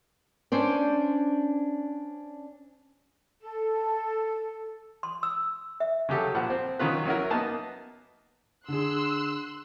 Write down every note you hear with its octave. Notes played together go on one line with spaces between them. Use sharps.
C#4 D4 C5 D5
A4
C6
E6
E5
C#3 F#3 G4 A4
A#1 F3 F#5
C4
D#3 F#3 C#4 F4 B4
F#3 C#4 E4 F#4 A#4
A#3 B3 D#4 A5
D3 G#4 C6 E6 F#6